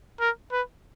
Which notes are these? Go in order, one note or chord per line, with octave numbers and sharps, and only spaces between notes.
A#4
B4